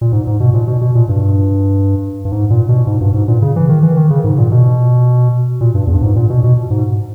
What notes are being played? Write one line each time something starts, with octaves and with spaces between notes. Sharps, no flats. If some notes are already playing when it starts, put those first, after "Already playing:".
A#2
G#2
G#2
B2
A#2
B2
B2
A#2
G2
G2
G#2
A#2
B2
G#2
G2
G#2
A#2
C#3
E3
D#3
E3
D#3
C#3
G#2
A#2
B2
A#2
G2
E2
G2
G#2
A#2
B2
B2
G#2